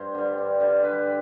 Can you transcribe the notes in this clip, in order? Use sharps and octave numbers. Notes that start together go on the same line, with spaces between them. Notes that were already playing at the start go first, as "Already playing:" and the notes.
Already playing: G2 C5
D3 G3
G2
D3 G3
G2 B4